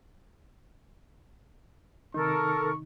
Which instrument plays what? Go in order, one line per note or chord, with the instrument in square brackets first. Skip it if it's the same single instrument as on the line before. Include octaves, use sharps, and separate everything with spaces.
[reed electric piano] C3 D#3 D#4 [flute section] A4 A#4 [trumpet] C#6